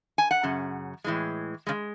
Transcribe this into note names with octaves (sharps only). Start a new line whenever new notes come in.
G#5
F#5
F#2 C#3
A2 E3 G#3
C#3 G#3